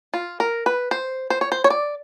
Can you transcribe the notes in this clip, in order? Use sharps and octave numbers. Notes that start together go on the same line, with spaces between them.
F4
A#4
B4
C5
C5
C#5
C5
C#5
D5